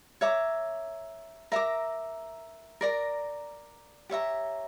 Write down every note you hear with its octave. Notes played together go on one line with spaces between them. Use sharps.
C#5 E5 A#5 D6
A#4 E5 A#5 D6
A#4 D5 A#5
G4 C#5 E5 A#5